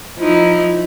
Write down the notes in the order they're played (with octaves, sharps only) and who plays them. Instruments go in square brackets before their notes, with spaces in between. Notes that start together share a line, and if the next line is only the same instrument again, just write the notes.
[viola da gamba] F3 D#4 E4